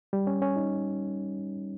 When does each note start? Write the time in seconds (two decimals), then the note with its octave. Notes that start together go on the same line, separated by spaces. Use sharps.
0.13 G3
0.27 C#4
0.42 C#4
0.56 D#4